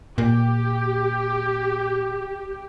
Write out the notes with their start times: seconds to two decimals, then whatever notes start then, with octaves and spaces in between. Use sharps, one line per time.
0.18 A#2 G4